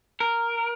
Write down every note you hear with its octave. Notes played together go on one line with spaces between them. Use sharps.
A#4